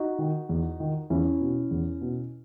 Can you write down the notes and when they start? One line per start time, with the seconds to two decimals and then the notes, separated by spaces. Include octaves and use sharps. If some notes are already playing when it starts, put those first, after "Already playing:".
Already playing: D#4 F#4
0.18 D#3
0.49 E2
0.80 D#3
1.10 E2 C#4 E4
1.40 B2
1.71 E2
2.01 B2